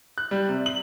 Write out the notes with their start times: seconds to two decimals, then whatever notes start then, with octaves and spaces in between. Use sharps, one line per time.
0.18 F#6
0.31 G3
0.49 C3
0.66 F#7